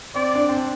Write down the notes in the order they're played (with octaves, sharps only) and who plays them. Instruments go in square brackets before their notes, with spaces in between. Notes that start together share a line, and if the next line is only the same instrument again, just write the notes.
[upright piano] C4 [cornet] D5
[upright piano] D4
C4
D4